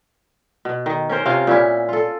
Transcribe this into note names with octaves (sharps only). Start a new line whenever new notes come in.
B2
D#3
C#4 A#4 C5
C3 C#4 F4 F5
A#2 C#4 E4
F4 A4